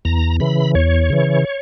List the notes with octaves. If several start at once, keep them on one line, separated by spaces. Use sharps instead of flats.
E2 A#5
C#3 E3 B5
E2 C#5
C#3 E3